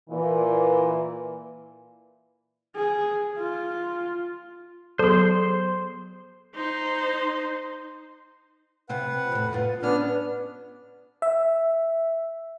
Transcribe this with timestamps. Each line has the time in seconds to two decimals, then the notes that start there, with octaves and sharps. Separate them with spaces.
0.10 A#2 E3
2.75 G#4
3.38 F4
4.99 F#3 B3 G#4 A4 C5 C6
6.55 D#4 C5
8.89 C3 F4 B4 C5 F#5
9.32 F2 A2
9.53 B3 F4
9.83 B3 C#4 D4 B4 F6
11.22 E5